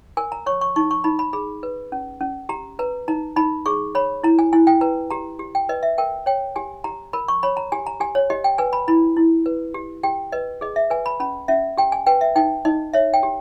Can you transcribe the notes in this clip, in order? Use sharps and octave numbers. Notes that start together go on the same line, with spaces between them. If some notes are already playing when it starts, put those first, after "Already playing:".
A#4 G#5
A#5
C#5 C#6
C#6
D#4 C#6
C#6
D#4 B5
B5
G#4 B5
B4
C#4
C#4
G4 A#5
B4 A#5
D#4 A#5
D#4 B5
G#4 C#6
C#5 B5
E4 A#5
G#5
E4 G#5
G5
B4 A#5
G4 A#5
G4
G5
B4 D#5
E5
A#4 G5
C#5 G5
G4 G#5
G4 A#5
A#4 B5
C#6
C#5 B5
A#5
G4 G#5
A#5
G4 G#5
C#5
G4 D#5
G5
B4 G#5
B5
E4 B5
E4
B4
G4
G4 G5
B4 D#5
G#4 D#5
E5
B4 G#5
B5
C#4 B5
C#4 E5
G4 G5
G#5
B4 G5
E5
D#4 G5
D#4 D#5
C#5 E5
G5
G4